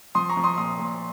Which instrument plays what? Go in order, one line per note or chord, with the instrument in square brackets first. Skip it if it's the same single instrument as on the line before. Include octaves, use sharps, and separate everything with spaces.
[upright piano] F3 C6 D#6
A#5 C#6
F3
C6 D#6
A#2 C6 D#6
A#2